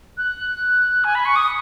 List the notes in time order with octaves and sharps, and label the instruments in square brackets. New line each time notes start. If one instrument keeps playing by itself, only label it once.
[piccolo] F#6
G#5
B5
C#6
D#6